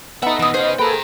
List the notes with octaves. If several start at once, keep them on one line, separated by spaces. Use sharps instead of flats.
B3 D#4 A4 B4 D#5 E5 F#5
B2 E3 E5 D#6
C#4 G#4 C5 F#5
A#3 G#4 A4 B4 G5 A#5